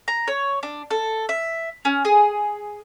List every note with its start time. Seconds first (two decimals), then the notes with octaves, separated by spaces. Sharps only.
0.08 A#5
0.28 C#5
0.63 D4
0.91 A4
1.29 E5
1.85 C#4
2.05 G#4